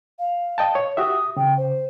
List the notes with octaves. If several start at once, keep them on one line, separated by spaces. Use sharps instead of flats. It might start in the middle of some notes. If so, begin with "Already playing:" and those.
F5
D#5 G5 A5
C#5
F#4 G4 E5 D#6
C#3 G5
C5